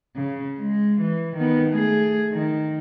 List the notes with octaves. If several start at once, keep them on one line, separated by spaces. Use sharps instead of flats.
C#3
G#3
E3
D#3 B3
A3 G#4
D#3